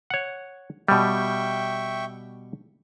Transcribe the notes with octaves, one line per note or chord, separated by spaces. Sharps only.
C#5 F#5
B2 G3 E5 G5 C#6